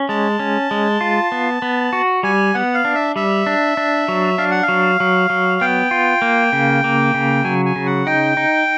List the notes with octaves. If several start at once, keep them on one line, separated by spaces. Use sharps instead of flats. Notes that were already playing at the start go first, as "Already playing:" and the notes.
Already playing: C#4
G#3 A5
C#4
G#3
F4
B3
B3
F#4
G3 G#5
B3 F#5
F5
D4
E5
G3 E5
D4
D4
F#3
D4 F5
F#5
F5
F#3
F#3
F#3
B3 G5
F4
A#3
C#3
A#3
C#3
F#3 G#5
G#5
C#3
F#5
D#4 G5
D#4